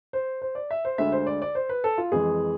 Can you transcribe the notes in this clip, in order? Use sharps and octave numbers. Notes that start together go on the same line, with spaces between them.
C5
C5
D5
E5
C5
D2 D3 G#3 E5
C5
D5
D5
C5
B4
A4
F4
F2 E3 G#3 G#4